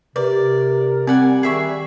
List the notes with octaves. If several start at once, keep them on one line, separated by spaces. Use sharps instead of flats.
C3 A#4 B4 D5
G3 C4 D5 F#5 G#5
D#3 G#4 E5 C#6